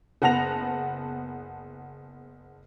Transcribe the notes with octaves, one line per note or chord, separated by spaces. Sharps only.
F#1 B3 F#5 A5 A#6 F7